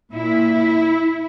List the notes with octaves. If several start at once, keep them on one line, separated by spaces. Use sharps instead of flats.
A#2 E4